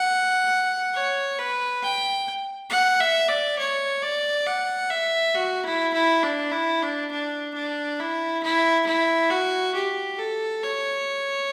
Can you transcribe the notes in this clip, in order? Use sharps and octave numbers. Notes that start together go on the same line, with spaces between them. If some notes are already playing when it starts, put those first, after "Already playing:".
Already playing: F#5
C#5
B4
G5
F#5
E5
D5
C#5
D5
F#5
E5
F#4
E4
E4
D4
E4
D4
D4
D4
E4
E4
E4
F#4
G4
A4
C#5